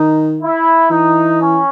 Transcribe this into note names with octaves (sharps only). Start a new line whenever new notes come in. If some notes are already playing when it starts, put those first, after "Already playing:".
Already playing: D#3 D#4
E4
E3 D#4
C#4